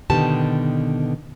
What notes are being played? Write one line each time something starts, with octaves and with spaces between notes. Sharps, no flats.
B2 D3 D#3 B3 G4 A5